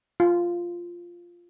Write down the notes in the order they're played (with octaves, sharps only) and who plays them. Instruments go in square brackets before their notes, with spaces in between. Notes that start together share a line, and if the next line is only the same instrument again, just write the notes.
[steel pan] F4